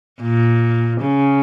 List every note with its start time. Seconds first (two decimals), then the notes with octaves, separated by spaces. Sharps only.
0.22 A#2
1.00 C#3